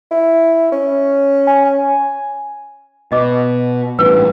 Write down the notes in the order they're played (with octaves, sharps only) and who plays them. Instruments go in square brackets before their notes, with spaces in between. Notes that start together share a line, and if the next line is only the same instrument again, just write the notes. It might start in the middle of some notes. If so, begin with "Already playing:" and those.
[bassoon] E4
C#4
[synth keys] G#5
[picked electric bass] B2 [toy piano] D#5 D6
[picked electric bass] A1 G2 E3 [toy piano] B4